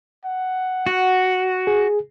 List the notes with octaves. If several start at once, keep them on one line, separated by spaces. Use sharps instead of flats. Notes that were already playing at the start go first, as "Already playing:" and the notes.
F#5
F#4
G#4